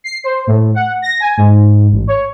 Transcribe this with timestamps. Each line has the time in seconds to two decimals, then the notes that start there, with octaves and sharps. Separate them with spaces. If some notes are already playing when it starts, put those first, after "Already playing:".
0.04 C7
0.24 C5
0.47 A2
0.75 F#5
1.02 A#6
1.20 G#5
1.37 G#2
1.92 A1
2.07 C#5